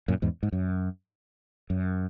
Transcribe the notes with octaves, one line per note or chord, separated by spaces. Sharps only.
F#2 A#2
E2 G#2
G#2
F#2
F#2